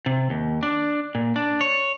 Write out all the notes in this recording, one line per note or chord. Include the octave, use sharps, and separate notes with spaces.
C3
D#2
D4
A#2
D4
C#5